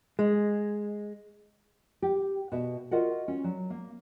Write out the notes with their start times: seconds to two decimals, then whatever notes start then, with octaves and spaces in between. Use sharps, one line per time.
0.19 G#3
2.02 G4
2.52 B2 F#4 E5
2.91 F4 F#4 A#4 D#5 E5 F#5
3.28 C#4
3.44 F#3
3.70 A#3